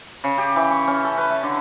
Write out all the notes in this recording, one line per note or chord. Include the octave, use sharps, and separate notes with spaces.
C#3
G4
E3
C#6
C#4
A4
B4
E4
D3